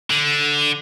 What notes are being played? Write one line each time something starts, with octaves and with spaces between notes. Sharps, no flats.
D3